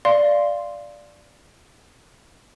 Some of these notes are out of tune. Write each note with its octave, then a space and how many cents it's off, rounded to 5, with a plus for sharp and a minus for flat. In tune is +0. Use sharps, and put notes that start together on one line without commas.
D5 +0 F5 -15 C6 +0